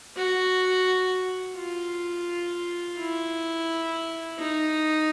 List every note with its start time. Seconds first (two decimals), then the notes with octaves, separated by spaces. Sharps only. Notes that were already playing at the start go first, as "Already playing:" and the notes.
0.16 F#4
1.57 F4
2.99 E4
4.38 D#4